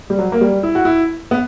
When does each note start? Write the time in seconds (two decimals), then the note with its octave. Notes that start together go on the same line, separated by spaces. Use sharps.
0.10 G3
0.19 F#3
0.32 A#3
0.41 G3
0.63 E4
0.75 F#4
0.85 E4
1.31 B3